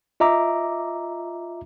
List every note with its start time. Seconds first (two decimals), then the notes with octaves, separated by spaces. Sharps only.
0.20 F4 D#5 E5 A#5 D6